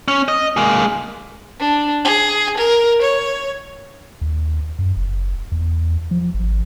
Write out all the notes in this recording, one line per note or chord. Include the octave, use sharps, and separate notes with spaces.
C#4
D#5
G#3 A#3
D4
G#4
A#4
C#5
D#2
F#2
F#1
E2
F3
G#1